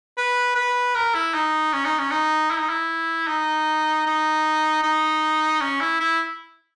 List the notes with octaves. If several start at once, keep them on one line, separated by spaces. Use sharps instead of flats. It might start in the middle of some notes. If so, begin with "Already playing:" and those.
B4
B4
A#4
E4
D#4
C#4
D#4
C#4
D#4
E4
D#4
E4
D#4
D#4
D#4
C#4
E4
E4